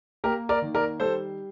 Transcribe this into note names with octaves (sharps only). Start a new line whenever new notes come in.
A#3 G4 A#4
A#4 D5
D#3
A#4 D5
G3 A4 C5